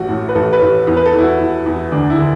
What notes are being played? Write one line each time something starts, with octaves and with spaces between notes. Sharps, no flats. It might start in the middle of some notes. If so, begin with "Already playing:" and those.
Already playing: A1 A3 F#4
A2
B4
A1 A4
B4
A1
E2
B4
A4
E2 E4
F#4
E2
E2
D2 D4
E4
D3